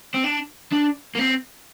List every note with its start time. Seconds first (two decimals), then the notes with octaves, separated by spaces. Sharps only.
0.14 C4
0.24 D4
0.72 D4
1.15 A#3
1.19 C4